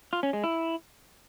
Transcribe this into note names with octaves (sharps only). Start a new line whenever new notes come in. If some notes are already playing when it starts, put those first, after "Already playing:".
F4
C#4
G#3
E4